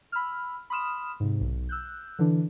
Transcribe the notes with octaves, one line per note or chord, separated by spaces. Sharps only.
B5 E6 F6
B5 C6 D#6 F6 E7
G#2 C3
B1
E6 F#6 G6
D3 E3 D4